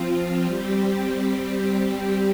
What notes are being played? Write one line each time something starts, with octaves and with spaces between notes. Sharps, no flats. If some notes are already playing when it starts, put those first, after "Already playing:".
Already playing: F3 C4 F4
G3 C4 G4